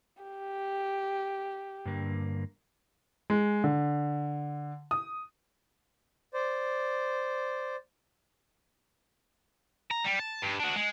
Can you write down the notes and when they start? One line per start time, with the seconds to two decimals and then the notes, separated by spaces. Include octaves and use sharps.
0.23 G4
1.85 G2 D3 A#3
3.30 G#3
3.64 D3
4.91 D#6
6.34 C5 D5
9.91 A#5
10.05 G3
10.19 A5
10.42 G2
10.60 D4 F#4
10.76 G#3